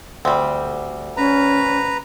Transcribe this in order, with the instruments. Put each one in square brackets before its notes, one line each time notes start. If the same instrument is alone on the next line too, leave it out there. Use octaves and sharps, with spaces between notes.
[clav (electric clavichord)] D2 [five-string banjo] G3 C4
[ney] C#4 [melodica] B4 A#5